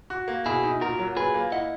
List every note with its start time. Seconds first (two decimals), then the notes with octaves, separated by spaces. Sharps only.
0.10 F#4
0.28 A#3
0.45 B2 E4 G#4
0.63 D#4
0.81 A#2 F#4 A#4
0.99 F#3
1.17 A#2 G#4 B4
1.34 A#3
1.52 E4 D#5 F#5